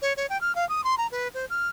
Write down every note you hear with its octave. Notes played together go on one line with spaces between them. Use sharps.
C#5
C#5
G5
F6
F5
D#6
C6
A#5
B4
C5
F6